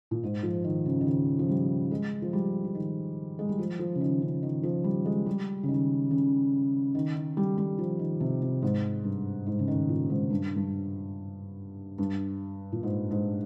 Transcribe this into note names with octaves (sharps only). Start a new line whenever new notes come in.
A#2
G#2
F3
D#3
C#3
D#3
C#3
F3
G3
G#3
F3
G3
F3
D#3
G#3
G3
F3
F3
C#3
D#3
C#3
D#3
F3
G3
G#3
G3
C#3
D#3
C#3
D#3
D#3
G3
G3
F3
D#3
C3
C3
G#2
G2
G#2
C#3
D#3
A#2
G#2
G2
G2
G2
A#2
G#2
G#2